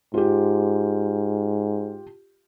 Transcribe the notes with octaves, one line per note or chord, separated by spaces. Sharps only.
G#2 F4 G4